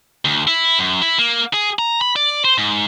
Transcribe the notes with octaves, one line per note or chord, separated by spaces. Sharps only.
D2
E4
F#2
E4
A#3
G#4
A#5
B5
D5
C5
G#2